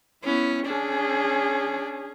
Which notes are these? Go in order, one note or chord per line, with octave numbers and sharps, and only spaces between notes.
B3 C#4 E4
C#4 D4 G#4